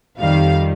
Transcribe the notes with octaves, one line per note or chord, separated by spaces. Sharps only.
F2 D#3 G3 F5